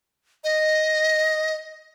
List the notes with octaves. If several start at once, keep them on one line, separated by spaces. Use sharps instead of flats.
D#5